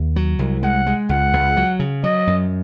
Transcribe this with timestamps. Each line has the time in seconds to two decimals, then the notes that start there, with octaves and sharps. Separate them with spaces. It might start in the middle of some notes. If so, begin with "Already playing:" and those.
Already playing: D#2
0.16 F#3
0.39 C2
0.63 G#3 F#5
0.87 G#3
1.09 C#2 F#5
1.33 C#2
1.57 F#3
1.80 C#3
2.04 F#3 D#5
2.27 F#2